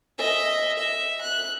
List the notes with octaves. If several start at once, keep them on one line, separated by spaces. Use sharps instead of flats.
D#5 E5
E5
F#6